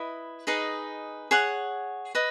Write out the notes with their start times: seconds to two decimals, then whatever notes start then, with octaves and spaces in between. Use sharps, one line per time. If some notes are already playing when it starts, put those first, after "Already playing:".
Already playing: E4 B4 D#5
0.47 D#4 G#4 B4 D#5
1.31 G#4 C#5 F#5
2.15 B4 D#5